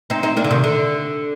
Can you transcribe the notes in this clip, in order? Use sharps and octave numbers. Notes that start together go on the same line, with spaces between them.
C4 D#4
C4 D#4
A#3 D4
D3
C3 D#3
D3